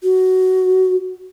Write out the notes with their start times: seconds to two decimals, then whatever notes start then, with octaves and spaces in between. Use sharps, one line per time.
0.03 F#4